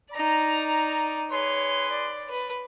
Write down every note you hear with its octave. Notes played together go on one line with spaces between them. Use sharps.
D#4 D5 A#5
G#4 B4 C#5 C6
D5
B4